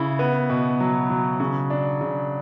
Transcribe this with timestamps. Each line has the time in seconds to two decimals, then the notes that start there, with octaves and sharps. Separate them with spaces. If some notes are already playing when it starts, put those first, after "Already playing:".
Already playing: C#3 E4
0.19 B3
0.50 B2
0.80 F#3
1.10 F#3
1.40 C#3
1.70 D4
2.01 C#3